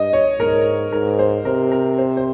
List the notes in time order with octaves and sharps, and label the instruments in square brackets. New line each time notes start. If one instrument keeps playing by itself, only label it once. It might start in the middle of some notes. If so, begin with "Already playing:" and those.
Already playing: [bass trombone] G2 [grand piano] D#5
[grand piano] C#5
[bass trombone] G#2 [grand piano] A#4
[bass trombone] G#2 [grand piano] A#4
[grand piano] C5
[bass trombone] C3 [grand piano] A#4
[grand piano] A#4
C5
C5